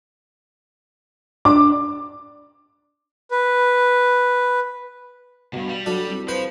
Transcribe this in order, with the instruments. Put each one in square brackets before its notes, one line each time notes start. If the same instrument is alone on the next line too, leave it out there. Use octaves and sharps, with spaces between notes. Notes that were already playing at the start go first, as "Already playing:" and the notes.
[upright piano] D4 [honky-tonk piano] D6
[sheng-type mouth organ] B4
[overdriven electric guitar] D2 G2 [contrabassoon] B2
[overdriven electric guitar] G3
[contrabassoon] F#3 [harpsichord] D4 A4
[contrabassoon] C2
[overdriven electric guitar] F3 [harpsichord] B4 C5